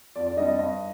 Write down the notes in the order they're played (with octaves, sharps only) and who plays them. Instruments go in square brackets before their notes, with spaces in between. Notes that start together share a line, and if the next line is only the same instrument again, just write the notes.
[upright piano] F2 D5
D5
C3 G3 D4 D#5
D#5
G2 D#5